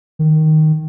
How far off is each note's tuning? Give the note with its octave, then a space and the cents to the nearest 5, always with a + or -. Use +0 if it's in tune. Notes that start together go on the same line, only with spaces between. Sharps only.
D#3 +0